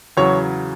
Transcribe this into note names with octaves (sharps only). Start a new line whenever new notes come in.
E2 C#3 F#3 C#5